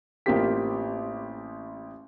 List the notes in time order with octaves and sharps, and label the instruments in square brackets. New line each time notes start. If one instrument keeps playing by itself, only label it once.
[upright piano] A1 A#3 C4 F4 G4 B6